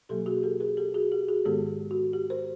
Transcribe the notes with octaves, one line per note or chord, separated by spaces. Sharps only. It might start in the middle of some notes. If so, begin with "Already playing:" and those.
B2 F#3 A#3 G4 A4
F#4 G#4
G4 A4
G#4 A#4
G4 A4
F#4 G#4
G4
F#4 G#4
G#2 D#3 G#3 B3 G4 A4
F#4
G4
A#4 C5